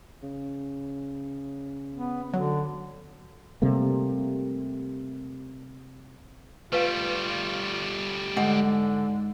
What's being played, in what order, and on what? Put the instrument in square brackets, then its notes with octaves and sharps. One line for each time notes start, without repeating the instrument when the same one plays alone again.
[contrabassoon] C#3
[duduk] B3
[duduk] D3 [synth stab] F#3
[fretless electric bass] C3 G3 A3 A#3
[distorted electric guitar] G3 A3 [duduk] F4 [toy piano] B4 F5
[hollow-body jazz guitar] G#2 [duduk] D3 [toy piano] F#5